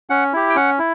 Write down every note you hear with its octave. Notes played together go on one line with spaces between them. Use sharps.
C#4 F#5
E4 G4
G5
C#4 F#5
E4